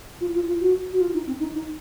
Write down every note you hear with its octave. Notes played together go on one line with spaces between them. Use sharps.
F4
F4
F4
F#4
F#4
F4
D#4
C4
D#4
D#4